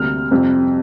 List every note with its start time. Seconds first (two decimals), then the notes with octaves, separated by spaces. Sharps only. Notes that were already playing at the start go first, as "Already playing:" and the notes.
Already playing: D2 C3 G3 A#3 F6
0.31 F2 C3 G3 C4